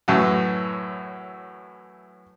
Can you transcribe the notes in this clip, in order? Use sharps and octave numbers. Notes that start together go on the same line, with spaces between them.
F#2 A2 E3 F#3